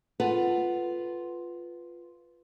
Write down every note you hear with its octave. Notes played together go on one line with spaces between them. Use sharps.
F4 A4 B4 F#5